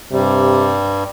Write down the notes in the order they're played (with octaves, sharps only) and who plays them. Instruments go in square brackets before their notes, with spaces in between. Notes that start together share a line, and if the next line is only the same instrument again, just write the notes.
[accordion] G2 G3 [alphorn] C3